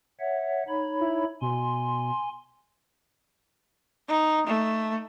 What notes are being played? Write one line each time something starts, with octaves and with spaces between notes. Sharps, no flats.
C#5 E5 F#5
D#4 C#5 B5
E4
B2 G#5 C6
D#4
A3